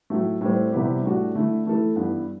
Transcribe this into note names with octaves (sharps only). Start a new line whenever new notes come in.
A2 F#3 A3
A2 G3 C4
C3 G3 B3 E4 G4
A2 G3 D4 F#4
D3 A3 E4
E3 A3 E4 A4
G2 E3 B3